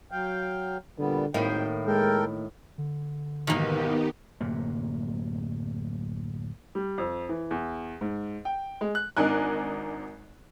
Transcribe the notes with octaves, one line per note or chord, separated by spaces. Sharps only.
F#3 F5 G5
A#2 D3 G3 B3
G#1 A2 D#3 A#3 G5
G#3 A4 A#4 G5
D3
B1 E2 G#2 D#3 A#3 B3 D#4 G4
D1 F#2 C3 A#3
G3
F2
E3
E2
G#2
G5
G#3
F#6
G#1 D4 D#4 A#4 G#5 F#6